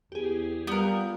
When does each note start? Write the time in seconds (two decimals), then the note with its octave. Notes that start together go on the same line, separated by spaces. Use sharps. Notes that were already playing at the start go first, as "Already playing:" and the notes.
0.12 E2 G4 G#4
0.67 G3 B3 F4 G4 A#4 G6